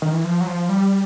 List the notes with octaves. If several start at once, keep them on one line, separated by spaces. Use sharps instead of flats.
D#3
E3
F3
F#3
F3
G3